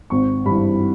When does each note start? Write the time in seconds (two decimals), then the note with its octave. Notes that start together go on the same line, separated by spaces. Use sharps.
0.10 G#1 C#6
0.46 G2 E3 B5